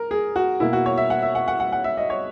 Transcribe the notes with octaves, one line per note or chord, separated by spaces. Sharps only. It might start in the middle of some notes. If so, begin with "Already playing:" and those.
Already playing: A#4
G#4
F#4
B2 A#3 E4
F#4
C#5
E5
F#5
E5
F#5
F#5
F#5
F#5
E5
D#5
C#5